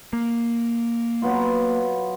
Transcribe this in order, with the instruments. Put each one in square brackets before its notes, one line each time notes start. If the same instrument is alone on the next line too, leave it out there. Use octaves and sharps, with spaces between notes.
[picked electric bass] A#3
[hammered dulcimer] F#3 B3 F4